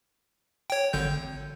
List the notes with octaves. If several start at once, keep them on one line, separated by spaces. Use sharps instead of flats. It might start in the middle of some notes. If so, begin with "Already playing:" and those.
C#5 G5
G#1 D3 G6